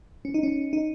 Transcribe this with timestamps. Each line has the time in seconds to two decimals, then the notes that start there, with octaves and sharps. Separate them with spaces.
0.25 C#4
0.34 D#4
0.43 C#4
0.73 D#4